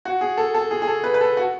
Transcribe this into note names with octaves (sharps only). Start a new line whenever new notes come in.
F#4
G#4
A4
A4
G#4
G#4
A4
B4
B4
A4
F#4